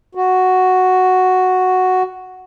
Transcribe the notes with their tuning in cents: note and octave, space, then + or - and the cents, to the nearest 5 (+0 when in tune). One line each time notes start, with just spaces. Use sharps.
F#4 +0